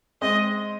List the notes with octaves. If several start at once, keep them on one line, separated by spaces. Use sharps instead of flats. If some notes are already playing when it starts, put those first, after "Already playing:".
G#3 C4 D#5